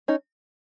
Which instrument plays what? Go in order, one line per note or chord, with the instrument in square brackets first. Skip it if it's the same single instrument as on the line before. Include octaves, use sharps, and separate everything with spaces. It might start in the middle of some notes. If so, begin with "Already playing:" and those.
[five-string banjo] C#4 D#4